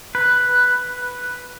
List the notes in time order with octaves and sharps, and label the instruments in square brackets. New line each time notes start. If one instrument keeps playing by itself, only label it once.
[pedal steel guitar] B4